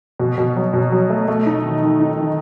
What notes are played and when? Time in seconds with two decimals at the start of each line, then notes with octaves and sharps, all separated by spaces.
0.20 B2
0.38 B2
0.56 F#3
0.73 B2
0.92 F#3
1.10 A3
1.28 A3
1.46 D#4
1.64 D#3
1.82 D#3
2.00 D#4
2.17 D#3